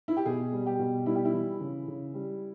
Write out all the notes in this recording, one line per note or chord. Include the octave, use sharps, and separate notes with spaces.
E4
G4
B2 G#4
G3
G4
B2
G3 E4
G4
E4
E3
C#3
C#3
G3